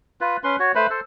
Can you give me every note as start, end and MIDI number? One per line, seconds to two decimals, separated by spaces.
0.21 0.37 65
0.21 0.37 71
0.44 0.56 61
0.44 0.56 71
0.44 0.56 84
0.59 0.72 66
0.59 0.72 73
0.75 0.87 57
0.75 0.87 71
0.75 0.87 72
0.75 0.87 83
0.90 1.00 69
0.90 1.00 72